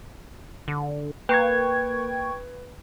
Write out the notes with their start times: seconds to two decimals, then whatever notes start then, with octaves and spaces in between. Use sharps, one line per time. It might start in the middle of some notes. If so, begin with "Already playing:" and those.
0.68 D3
1.29 A#3 B4 G5 C#6 G#6